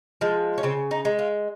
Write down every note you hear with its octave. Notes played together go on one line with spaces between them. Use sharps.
F3 G#3
C#4
C#3 C4
D#4
G#3
F4